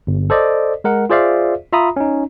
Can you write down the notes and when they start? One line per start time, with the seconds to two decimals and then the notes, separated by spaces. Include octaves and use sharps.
0.07 G1
0.30 A4 C5 D5 D#5
0.84 G#3 A#4 F#5
1.10 F4 G#4 C5 D5 E5 F5
1.72 F4 E5 A#5 B5 D#6
1.96 C#4 D#4